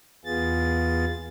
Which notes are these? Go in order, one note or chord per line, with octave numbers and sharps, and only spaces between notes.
E2 B3 F4 G#4 A6